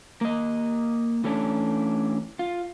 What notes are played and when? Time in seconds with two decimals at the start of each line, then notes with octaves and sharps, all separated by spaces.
0.21 A#3 D#5
1.24 E3 A3 C#4 D4
2.39 F4